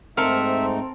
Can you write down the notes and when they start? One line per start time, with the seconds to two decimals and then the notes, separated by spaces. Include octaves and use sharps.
0.17 G#2 A3 C4 D#4 A4 A#4 E5 F5